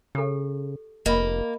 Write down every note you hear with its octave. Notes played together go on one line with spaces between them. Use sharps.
C#3 G4 A4
F1 A#3 D#5 B5